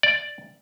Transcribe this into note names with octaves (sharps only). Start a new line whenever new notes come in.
D5